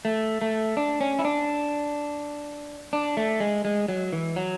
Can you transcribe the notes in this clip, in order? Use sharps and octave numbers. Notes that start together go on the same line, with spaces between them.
A3
A3
D4
C#4
E4
D4
D4
A3
G#3
G#3
F#3
E3
F#3